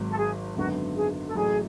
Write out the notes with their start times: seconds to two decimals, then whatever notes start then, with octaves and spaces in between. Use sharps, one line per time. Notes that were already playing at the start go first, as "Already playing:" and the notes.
Already playing: G#1 G#2 F#3
0.10 A4
0.18 G#4
0.56 G#1 F#2 D3 F#3 B3 F#4
0.96 G#4
1.27 A4
1.35 A1 A2 F#3 G#4